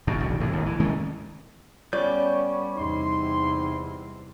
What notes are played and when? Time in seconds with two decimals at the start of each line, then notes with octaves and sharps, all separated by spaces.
0.07 D1 F#2 B2
0.20 E1 B1 D3
0.40 A2 C3 E3
0.53 G1 D#2
0.66 E3
0.80 D#3 G#3 A3 C#4
1.93 G3 B3 C#4 D5 G6
2.76 E2 C3 D#4 C6